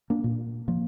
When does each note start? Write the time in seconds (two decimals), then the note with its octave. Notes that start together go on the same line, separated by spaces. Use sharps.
0.10 A#3 D4
0.24 A#2
0.68 F3 A#3